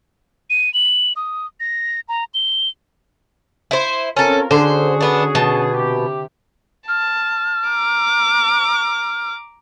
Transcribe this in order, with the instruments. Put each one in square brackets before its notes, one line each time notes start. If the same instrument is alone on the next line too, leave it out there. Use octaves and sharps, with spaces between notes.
[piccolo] D#7
F#7
D#6
A#6
A#5
G7
[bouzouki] E4 C5
[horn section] C4 F4 A#4 [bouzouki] C#4 A4
[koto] D3 [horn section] C#4 F#4 G#4 [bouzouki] C5
[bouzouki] B3 D4
[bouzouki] B2 [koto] A5
[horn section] C3 G4
[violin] A5 [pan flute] F6
[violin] A#5 D6